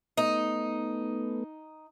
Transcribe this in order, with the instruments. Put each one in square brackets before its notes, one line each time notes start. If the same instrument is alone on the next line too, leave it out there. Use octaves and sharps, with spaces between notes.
[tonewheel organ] A3 B3 [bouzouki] D#4